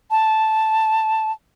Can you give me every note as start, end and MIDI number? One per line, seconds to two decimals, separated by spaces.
0.11 1.32 81